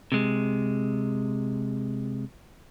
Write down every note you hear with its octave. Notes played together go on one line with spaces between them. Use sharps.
C3 G#3